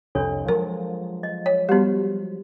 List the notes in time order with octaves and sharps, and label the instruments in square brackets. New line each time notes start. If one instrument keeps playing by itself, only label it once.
[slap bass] C2 F2 [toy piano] D4 A4 C#5
[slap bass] F3 F#3 G#3 [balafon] A#4
[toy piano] D#5
[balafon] C#5
[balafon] G3 B3 [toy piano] F#4 G4